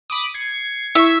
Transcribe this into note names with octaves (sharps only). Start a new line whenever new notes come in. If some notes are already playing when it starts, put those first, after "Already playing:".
B5 D6 D#6
G#6 C7 C#7
E4 E5 C#6